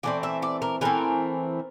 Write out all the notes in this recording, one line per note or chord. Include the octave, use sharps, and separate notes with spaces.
E3 A3 C4 D5
E5
D5
A#4
E3 A3 C4 A#4